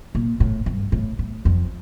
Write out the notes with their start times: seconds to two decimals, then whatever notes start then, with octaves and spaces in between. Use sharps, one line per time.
0.15 A#2
0.40 A2
0.66 G2
0.92 A2
1.19 A2
1.45 F2